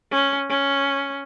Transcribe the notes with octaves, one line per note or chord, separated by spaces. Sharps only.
C#4
C#4